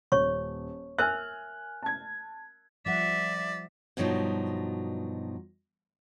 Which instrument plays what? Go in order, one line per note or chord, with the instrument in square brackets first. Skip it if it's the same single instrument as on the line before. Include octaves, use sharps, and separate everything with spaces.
[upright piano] D#1 [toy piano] C#5 C#6
[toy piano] A#4 E5 [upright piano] G#5 F6 F#6
[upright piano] A5 G#6
[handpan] F3 G3 F#5 [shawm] D5 [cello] E5
[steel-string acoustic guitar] G2 B2 F3 F#3 D#4